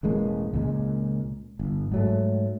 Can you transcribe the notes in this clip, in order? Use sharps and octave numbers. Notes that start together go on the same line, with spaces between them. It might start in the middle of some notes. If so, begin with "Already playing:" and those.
E1 A1 G#3 A#3
C#2 A#2 G#3
G1
G#2 F#3 A3